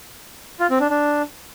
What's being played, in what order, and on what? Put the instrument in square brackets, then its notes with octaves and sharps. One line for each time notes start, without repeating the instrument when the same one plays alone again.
[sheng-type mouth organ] F4
C4
D4
D4